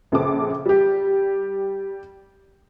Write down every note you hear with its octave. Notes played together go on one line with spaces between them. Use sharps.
A#1 C#3 A4 C5 D6
G3 G4